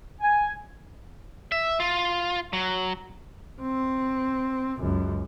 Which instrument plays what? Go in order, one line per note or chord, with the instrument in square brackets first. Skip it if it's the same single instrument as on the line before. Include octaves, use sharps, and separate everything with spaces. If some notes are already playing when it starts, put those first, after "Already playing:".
[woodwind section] G#5
[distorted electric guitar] E5
F4
F#3
[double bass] C4
C#2 F#2